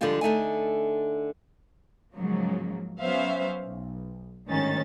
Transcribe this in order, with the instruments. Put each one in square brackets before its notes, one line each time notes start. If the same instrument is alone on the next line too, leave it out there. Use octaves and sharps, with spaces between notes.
[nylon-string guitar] D3 F3 G3 G#3 F4 G4
D3 A3 D#4 G#5
[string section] G#2 C#3 F3 F#3 A#3
F#3 B3 C#4 C5 E5 F5
B1
G1 D2 G#2 D#3 C#4 A6